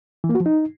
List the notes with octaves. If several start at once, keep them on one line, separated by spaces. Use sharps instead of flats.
E3
A#3
F#4
F3
D#4